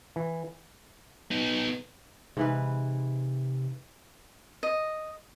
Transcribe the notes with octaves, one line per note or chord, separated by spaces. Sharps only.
E3
B3 D#4
G#2 C3 E3 B4
D#5